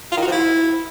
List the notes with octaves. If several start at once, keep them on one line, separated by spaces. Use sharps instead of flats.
F4
D#3
F#4
F3
E4